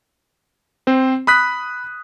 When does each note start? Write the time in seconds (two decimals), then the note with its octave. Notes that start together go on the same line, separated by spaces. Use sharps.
0.87 C4 C5
1.27 B5 D#6 F#6 B6